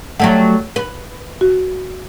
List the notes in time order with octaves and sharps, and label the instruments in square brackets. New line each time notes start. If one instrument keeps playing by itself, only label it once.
[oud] F#3 G3 A3 [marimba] F#5
[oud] B4
[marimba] F#4